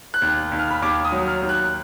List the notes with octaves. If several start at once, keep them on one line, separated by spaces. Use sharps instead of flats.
F#6
D#2
D#2
F6
B5
D#2 D6
D#6
F#3
F6
D#2
F#6